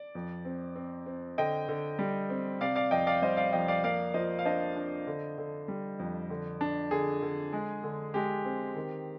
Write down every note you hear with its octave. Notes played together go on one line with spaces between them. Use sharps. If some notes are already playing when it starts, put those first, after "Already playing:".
Already playing: D5
F2
C4
C4
C4
D3 D#5 G5
D3
G3
C4
C3 D5 F5
D5 F5
F2 D#5 G5
D5 F5
G3 C5 D#5
D5 F5
F2 D#5 G5
D5 F5
A#3 D5 F5
F3 C5 D#5
F5
D4 C5 D#5
D4
D3
D3
G3
F2
D3
D4
D3 G#4
D3
G#3
D3
G#3 G4
C4
D#3